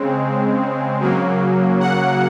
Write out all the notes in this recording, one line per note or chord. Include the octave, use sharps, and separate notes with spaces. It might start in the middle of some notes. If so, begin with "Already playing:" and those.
Already playing: C#3 G#3 C4
C#3 F#3 A#3
F#5